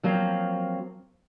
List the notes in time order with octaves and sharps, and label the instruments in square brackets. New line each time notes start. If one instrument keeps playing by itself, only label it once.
[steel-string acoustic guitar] F3 F#3 A#3 C4